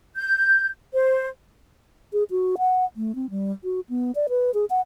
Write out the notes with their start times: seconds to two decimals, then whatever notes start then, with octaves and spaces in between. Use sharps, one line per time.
0.16 G6
0.93 C5
2.13 G#4
2.31 F#4
2.58 F#5
2.96 A3
3.15 C4
3.30 G3
3.64 F#4
3.89 B3
4.15 D5
4.29 B4
4.54 G#4
4.70 F#5